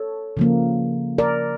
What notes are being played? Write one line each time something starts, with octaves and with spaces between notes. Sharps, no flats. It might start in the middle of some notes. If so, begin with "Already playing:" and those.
Already playing: A4 C#5
C#3 F3 A#3
A#4 D5